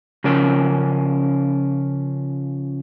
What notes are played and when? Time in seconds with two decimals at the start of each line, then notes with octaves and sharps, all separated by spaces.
0.24 C#3 F3 C#4 A#4